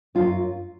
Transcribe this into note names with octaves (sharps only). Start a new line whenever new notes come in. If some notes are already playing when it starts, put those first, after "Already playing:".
F#2 F4